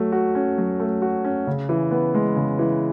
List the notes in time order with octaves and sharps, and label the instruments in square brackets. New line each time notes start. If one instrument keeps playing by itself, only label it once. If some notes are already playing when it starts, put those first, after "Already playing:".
Already playing: [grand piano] F#3 A3
F#4
C#4
F#3
A3
F#4
C#4
C#3
E3
B3
G#3
C#3
E3